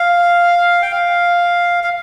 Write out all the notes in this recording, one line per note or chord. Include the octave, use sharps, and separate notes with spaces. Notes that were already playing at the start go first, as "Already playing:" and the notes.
Already playing: F5
G5
F5
F5